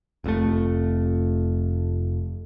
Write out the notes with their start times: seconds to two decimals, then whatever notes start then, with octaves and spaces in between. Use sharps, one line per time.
0.24 F1 F2 G#2 A3